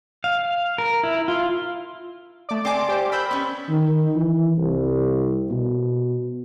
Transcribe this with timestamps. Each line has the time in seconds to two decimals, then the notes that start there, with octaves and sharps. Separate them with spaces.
0.24 F5
0.78 A#4
1.03 E4
1.28 F4
2.49 A3 D5
2.65 C4 D5 G#5 C6 D6
2.89 G4 C5
3.12 A#4 B5 E6 G6
3.31 B3 C#4
3.69 D#3
4.16 E3
4.58 C2
5.50 B2